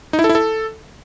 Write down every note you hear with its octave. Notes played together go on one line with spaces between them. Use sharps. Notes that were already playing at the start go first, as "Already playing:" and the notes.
D#4
E4
A4
E4
A4